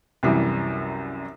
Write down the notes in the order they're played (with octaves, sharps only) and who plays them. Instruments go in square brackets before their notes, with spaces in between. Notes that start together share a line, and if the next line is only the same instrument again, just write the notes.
[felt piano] C2 F#2 E3 G3